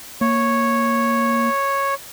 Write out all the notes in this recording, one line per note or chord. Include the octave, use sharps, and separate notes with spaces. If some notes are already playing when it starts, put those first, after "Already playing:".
A#3 C#5